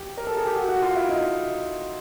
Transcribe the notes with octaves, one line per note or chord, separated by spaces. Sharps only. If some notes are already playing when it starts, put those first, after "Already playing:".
Already playing: G4
A#4
A4
G#4
G4
F#4
F#4
F4
E4
D#4